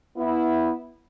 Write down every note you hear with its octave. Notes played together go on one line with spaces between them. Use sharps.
B3 E4